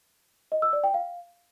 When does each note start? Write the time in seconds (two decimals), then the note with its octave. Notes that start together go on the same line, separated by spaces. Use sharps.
0.52 D#5
0.62 E6
0.73 D5
0.84 G5
0.94 F5